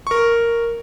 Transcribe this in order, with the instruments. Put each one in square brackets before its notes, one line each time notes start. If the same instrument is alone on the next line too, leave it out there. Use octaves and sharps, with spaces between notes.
[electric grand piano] A#4 C#6